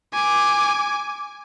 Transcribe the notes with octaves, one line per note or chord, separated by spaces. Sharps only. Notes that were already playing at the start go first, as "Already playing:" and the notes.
G#5 D6